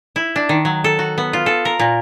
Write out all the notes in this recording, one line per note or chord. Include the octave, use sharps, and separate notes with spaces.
E4
D4
D#3
F#3
A4
F#4
B3
F4
A4
A#4
A#2